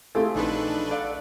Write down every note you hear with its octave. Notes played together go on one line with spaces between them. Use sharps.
G#3 A3 C4 E4 F4 G4 G#4
A#1 E3 F#3 D4 D#4 A4 B4
A4 D5 F5 F#5